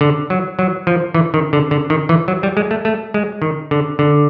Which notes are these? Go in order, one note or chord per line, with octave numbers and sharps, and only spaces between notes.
D3
F#3
F#3
F3
E3
D#3
D3
D3
D#3
E3
F#3
G3
G#3
A3
A3
G#3
D#3
D3
D3